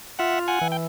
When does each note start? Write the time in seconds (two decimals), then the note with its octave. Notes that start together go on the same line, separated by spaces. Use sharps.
0.19 F4 E5 F#5
0.48 F#5 G#5
0.61 E3
0.72 G5